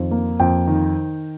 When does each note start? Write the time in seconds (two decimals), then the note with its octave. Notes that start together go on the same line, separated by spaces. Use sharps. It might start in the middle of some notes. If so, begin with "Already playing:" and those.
Already playing: F2 D#3
0.11 A#3
0.40 F2 G5
0.68 D#3